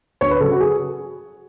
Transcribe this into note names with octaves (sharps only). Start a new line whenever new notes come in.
D2 C#5
B4
C#3 F#3 A4
F#4
G#4